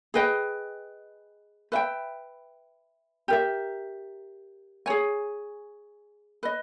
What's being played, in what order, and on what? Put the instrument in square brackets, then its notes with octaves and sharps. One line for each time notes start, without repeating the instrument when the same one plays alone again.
[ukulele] G#4 B4 D#5 G5
B4 E5 G5
G4 A#4 E5
G#4 C#5 G#5
B4 D#5